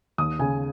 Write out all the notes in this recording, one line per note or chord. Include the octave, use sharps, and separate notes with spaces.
D#2 D#6
C#3 G#5